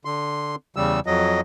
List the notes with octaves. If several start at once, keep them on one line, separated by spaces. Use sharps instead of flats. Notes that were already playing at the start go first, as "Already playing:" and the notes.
D3 C6
E2 C#3 G3 E6
F2 F#3 D#5